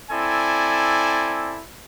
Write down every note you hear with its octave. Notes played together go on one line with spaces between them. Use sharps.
C4 E4 A4 D5 G#5